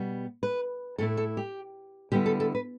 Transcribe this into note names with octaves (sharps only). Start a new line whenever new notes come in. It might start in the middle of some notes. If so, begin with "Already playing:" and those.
Already playing: B2 G3 B3
B4
A2 A3 E4 A4
A4
G4
D3 G3 B3 E4 G4
A4
A4
B4